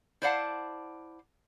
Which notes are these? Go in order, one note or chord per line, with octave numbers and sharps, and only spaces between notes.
E4 C5 D5 F5 F#5 A5